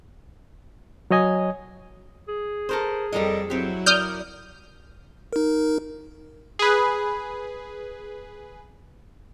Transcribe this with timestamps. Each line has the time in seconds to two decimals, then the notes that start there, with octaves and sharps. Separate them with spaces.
1.11 F#3 C#5 D#5 G#5 D#6
2.28 G#4
2.69 A4 A#4 C5
3.12 F2 G3 G4 A4 A#4 D#5
3.50 F#3 C4 E4 G4
3.86 A#4 D5 D#6 F6 G6
5.33 D#4 A#4
6.59 G#4 B4